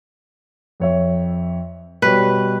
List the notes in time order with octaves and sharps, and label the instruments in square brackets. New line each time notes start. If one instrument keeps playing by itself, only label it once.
[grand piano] F2 C#5 E5
[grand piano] B2 G3 C#5 [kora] B4